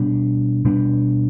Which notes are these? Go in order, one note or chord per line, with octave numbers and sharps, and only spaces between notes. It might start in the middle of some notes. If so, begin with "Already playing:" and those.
Already playing: B2 G3 B3 D4
B2 G3 B3 D4